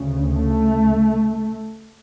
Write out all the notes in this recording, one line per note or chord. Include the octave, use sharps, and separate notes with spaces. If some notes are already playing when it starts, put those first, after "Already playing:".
Already playing: D2 C#3
A3